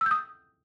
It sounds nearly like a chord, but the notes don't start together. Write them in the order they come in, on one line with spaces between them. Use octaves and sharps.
E6 G6 D#6